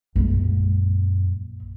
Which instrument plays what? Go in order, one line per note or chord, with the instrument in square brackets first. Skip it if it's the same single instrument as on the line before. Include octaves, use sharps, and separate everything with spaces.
[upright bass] A#1 G#3 [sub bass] F#2